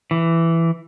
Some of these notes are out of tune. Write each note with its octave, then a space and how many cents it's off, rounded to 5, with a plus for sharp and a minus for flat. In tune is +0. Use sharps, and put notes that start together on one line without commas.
E3 +10